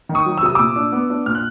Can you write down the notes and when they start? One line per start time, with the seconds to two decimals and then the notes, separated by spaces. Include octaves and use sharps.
0.09 D#3
0.15 C#6 D#6
0.26 F#3
0.37 E6
0.43 C3 D#6
0.55 A#2 D6 E6
0.76 D4
0.92 B3
1.10 D4
1.26 A#2 F6
1.35 F#6